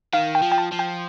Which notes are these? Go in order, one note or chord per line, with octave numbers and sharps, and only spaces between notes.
D#3 F5
G5
F3
G5
A5
F3
G5